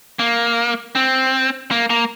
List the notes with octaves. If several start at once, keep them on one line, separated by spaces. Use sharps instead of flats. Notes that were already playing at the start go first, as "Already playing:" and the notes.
A#3
C4
A#3
A#3